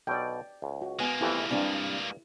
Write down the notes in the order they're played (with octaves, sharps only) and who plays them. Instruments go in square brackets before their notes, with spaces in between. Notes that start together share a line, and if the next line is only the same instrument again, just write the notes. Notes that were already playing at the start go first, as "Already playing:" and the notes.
[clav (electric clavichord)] B1 B2 [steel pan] D5 G5
[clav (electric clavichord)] C#2
[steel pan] F#4
[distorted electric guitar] G#3 A#3 [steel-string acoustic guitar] B3 G#5
[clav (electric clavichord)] F2 E3 A3 [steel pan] E4 G4
[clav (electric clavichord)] G2 G#5 [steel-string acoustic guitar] G3 C4 D4